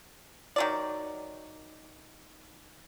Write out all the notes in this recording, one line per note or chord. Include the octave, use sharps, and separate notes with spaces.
D#3 F#3 D5